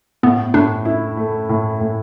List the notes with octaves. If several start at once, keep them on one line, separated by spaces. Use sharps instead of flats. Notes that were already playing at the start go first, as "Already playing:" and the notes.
A2 B3
A2 D4
E4
A3
A2
A2